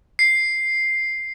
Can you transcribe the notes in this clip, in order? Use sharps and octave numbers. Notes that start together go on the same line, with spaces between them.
C7